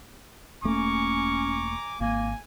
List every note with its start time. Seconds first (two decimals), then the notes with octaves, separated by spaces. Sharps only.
0.64 E1 A3 A#3 C#4 G#5 A#5 C#6 D6
2.01 G#1 A#3 G#5